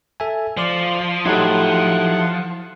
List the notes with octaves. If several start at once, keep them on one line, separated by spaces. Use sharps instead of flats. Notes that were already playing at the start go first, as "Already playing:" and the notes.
A4 E5 G#5
F3 C5 D5 D6
F#3 D#4 E4 G4 A4 F#5